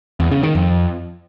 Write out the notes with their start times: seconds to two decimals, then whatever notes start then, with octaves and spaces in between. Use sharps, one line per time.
0.20 E2
0.31 C#3
0.43 D#3
0.55 F2